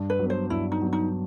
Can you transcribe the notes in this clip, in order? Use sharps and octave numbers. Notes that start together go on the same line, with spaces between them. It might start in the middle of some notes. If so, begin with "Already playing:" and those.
Already playing: G2
B4
F#3 B3
C5
G2 E4
D#4
F#3 B3
D#4